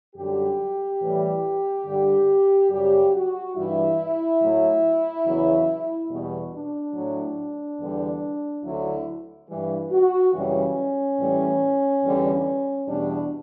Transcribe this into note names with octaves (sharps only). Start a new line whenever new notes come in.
F#2 D3 G3 G4
A2 E3 G3
G2 D3 G3
F#2 C#3 G3 G4
F#4
G2 E3 G3 E4
A2 F#3
E2 C#3 F#3
E2 B2 G3
D4
A2 F#3
E2 D3 G3
D2 D3 F#3 E4
G2 E3 G3
F#4
F#2 C#3 E3 G3 C#4
A2 E3 G3
E2 D3 G3
E2 B2 G3 D4